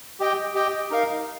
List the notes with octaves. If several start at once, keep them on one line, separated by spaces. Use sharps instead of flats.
G4 D#5 G5
G4 D#5 G5
D#4 A#4 F5